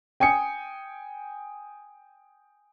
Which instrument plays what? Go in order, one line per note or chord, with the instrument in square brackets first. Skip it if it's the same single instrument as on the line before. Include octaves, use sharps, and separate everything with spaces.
[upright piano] G5 G#5 D#6 C#7